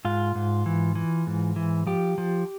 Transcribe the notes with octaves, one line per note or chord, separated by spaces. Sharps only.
G#2 F4
G#2
E3
E3
G#2
E3
F3 G4
F3